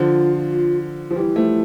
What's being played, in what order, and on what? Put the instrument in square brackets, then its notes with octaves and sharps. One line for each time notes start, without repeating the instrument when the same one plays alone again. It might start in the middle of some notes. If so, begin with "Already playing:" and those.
Already playing: [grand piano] D3 F3 [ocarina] F4
[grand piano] F3
[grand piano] E3 G3 [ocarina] E4
[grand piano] F3 A3